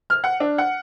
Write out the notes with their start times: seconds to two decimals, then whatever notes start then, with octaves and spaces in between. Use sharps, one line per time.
0.10 F6
0.24 F#5
0.40 D4
0.58 F#5